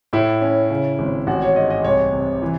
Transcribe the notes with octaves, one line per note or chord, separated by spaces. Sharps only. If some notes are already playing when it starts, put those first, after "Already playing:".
A2 E4
C#4
C#3
G#1
A1 F#4
C#5
G#2 D#5
D#5
C2 C#5
C3
E3